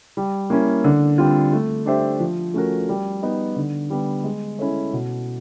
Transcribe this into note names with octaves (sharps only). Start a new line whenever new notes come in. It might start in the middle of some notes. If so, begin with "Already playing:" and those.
G3
A#3 C#4 E4
D3
G3 C4 F4
A3
D4 G4 C5 E5
F3
A3 C#4 F#4 A#4
G3
B3 D#4
D3
G3 B3
G#3
C#4 E4 A4 C#5
B2